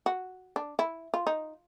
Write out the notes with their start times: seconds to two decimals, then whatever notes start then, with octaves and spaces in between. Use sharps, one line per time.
0.06 F#4
0.56 D4
0.79 E4
1.14 F4
1.27 D#4